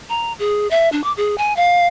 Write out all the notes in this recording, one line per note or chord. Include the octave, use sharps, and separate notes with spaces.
A#5
G#4
E5
D4
D6
G#4
G#5
F5